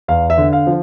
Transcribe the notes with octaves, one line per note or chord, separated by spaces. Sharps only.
E2 F5
E5
D3
F5
F3